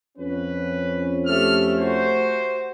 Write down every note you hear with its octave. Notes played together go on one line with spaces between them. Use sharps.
F2 C#4 B4
A3 G4 A4 F6
F#4 C5